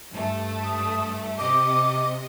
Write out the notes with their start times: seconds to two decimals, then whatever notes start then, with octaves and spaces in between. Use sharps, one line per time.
0.11 G2 A3
0.64 D#6
1.38 C3 D#5 D6